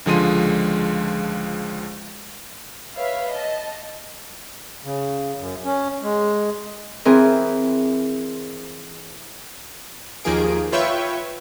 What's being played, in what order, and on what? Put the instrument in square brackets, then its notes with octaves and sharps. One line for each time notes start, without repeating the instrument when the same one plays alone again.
[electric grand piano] C#2 D3 F3 G#3 C6 D#7
[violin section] B4 C#5 E5 F5
D#5 A5
[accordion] C#3
F#2
C#4
G#3
[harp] E3 C4 G#4 A#4
[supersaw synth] D#2 D#3 F3 A#3 G#4 D7
F4 B4 C#5 E5 G5 C#6